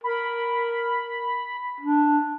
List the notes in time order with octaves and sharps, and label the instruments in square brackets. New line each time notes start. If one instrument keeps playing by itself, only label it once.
[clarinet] A#4 [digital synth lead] B5
[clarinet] D4